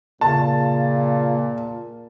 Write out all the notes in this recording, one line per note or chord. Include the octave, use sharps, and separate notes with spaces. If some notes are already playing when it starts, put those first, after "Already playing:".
A#2 C#3 A5